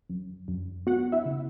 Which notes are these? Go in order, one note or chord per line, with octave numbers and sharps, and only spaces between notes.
F#2
F#2
B3 F#4 F#5
E4 E5
C#3